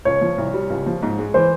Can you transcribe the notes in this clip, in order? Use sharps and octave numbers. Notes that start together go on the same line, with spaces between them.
C#2 C#5
F3
C2
G3
C#2
F3
G#2
G#3
E3 C5